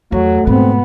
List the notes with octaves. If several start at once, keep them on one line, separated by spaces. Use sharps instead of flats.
E2 F#3 A3
G#2 B2 B3 C4